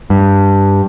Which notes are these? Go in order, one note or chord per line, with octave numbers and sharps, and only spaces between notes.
G2